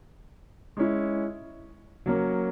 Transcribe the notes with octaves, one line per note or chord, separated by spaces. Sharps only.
G#3 C#4 E4
F#3 A#3 C#4